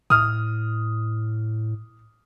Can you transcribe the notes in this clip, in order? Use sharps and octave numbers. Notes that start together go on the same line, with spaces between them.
A2 D#6 F6